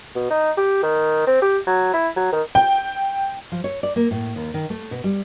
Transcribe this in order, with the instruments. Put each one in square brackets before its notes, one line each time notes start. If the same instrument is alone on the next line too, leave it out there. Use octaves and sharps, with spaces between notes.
[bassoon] B2
D#4
G4
D#3
C4
G4
F#3
E4
F#3
D#3
[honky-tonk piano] G5
[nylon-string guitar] F3
C#5
D5
A#3
A2
D#2
D#3
A3
B2
G3